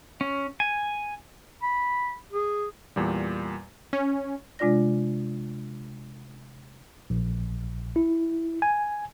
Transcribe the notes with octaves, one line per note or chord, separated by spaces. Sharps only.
C#4
G#5
B5
G#4
E2 A#2 G3
C#4
C3 G#3 D4 F4 D5 A#6
A#1
E4
G#5